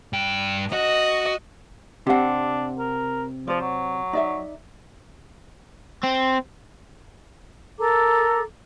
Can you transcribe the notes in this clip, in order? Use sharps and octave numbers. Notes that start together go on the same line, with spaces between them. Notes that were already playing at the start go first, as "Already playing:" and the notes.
G2 G5
F#4 D#5
C3 C4 D4 G4 F#5
A#4
F3 C5 D5
F#3
D#4 D5 E5
C4
A4 A#4 A#5 D6